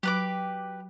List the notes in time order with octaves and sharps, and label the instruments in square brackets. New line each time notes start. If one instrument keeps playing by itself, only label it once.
[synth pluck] F#3 [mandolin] G4 B4 D6